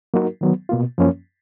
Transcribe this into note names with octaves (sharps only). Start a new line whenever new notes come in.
F#3 A#3 D#4 F#4 A#4
D#3 F#3 B3
B2 A#3 F4
F#2 F3 A#3 C#4